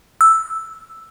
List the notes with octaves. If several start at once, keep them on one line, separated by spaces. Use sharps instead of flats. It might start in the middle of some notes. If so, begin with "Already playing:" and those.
E6